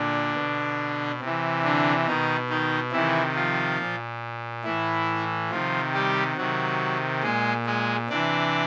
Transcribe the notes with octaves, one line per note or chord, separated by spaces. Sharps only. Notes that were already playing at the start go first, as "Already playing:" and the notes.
Already playing: A#2 D3 D4
B2
C3 E3
D3 D4
B2 D#3 D#4
D#3 D#4
C3 D#3 E3 E4
F3 F4
A#2
A2 E3 E4
C3 D#3 F3 F4
G3 G4
C3 D#3 F#3 F#4
A#2 G#3 G#4
G#3 G#4
C3 E3 D4 D5